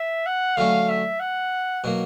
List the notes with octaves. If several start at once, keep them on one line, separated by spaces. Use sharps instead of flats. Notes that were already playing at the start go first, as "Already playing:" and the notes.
Already playing: E5
F#5
D3 F#3 A3 C#4 F5
E5
F#5
B2 F#3 A#3